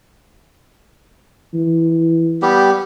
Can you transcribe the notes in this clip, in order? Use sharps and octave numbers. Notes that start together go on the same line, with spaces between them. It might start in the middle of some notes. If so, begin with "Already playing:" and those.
E3
G3 B3 G4